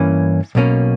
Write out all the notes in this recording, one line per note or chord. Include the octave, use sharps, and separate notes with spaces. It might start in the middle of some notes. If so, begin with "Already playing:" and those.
Already playing: G2 E3 A#3 C#4
B1 B2 A#3 C#4